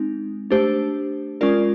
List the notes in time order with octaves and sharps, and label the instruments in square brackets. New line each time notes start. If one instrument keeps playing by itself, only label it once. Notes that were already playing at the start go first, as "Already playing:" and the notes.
Already playing: [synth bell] G#3 C4 D#4
A3 D4 G4 C5
G#3 C#4 F4 A#4 D5